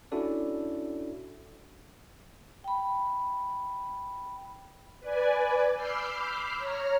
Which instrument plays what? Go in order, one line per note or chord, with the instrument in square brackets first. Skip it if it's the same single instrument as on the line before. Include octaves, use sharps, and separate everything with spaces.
[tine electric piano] C#4 D4 E4 F#4 A4 D5
[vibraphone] G5 B5
[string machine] B4 D5 G#5
B5 D6 E6 F6 G6 C7
C#5 A#5 F6